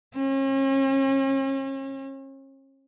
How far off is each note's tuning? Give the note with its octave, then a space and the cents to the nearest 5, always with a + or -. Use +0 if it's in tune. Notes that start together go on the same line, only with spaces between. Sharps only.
C#4 -40